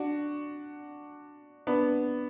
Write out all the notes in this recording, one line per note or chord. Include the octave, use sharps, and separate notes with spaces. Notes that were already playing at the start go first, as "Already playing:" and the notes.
Already playing: D4 F#4
B3 D4